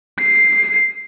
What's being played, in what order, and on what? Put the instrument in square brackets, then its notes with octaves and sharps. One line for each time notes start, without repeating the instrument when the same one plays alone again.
[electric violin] C7